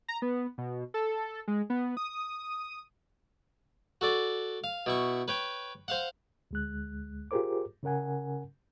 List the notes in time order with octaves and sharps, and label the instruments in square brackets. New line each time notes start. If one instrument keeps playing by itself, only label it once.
[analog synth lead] A#5
B3
B2
A4
G#3
B3
D#6
[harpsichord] F#4 A4 D5
F5
B2 E4 C#6
B4 C#5 G5
C5 F5 F#5
[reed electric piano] D2 G#3 F#6
F4 G4 G#4 A#4 C5 D6
C#3 C#4 A#4 F#5 G#5